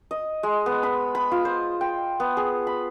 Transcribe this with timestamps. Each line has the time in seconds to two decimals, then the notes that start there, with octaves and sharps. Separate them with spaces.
0.11 D#5
0.43 G#3
0.66 B3
0.83 B5
1.15 B5
1.31 F4
1.45 C5
1.81 G5
2.20 B3
2.37 G#4
2.67 B5